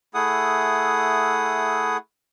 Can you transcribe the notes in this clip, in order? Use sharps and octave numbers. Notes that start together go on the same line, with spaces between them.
A3 E4 G#4 F#5 D#6